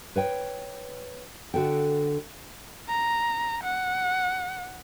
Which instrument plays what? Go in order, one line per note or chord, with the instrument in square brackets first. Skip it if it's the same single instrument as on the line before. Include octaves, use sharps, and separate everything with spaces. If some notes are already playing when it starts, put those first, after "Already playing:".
[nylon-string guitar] B4 C#5 G5
D3 F#4 A4 G5
[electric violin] A#5
F#5